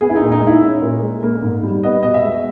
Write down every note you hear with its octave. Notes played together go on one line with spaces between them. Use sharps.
B3 G#4
E4
D#4
A#2
D#4
G#3
E4
C#4
A#2
G#3
A#3
G#2
G3
B3 D#5
B2 D#5
E5
G#3